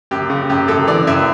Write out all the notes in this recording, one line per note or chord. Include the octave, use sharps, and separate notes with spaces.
F#2 G4
C#3
F#2 G4
F#2 A4
E3 D5
F#2 E5